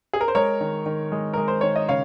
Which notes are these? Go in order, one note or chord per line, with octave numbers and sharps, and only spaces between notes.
G#4
A#4
C5
G#3 A#4 C#5
D#3
D#3
G#3
G#3 A#4
C5
D#3 C#5
D#5
C#3 C#5 F5